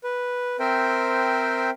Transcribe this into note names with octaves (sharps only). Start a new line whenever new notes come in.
B4
C4 A#4 C5 E5 G5